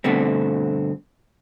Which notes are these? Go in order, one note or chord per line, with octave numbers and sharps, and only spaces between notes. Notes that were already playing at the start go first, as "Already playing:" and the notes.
G2 B2 D3 A3 C4